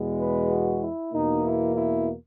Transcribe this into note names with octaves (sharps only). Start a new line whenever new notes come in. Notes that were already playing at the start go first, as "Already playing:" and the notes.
Already playing: E2 B2 G#3 B3
B4
F#4
E4
E2 B2 A#3 D#4
E4
E4